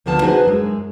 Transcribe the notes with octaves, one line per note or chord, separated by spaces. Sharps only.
D2 D3 F3 B3 A5
D4 D#4 F#4 G#4 B4 C5
F#2 G#3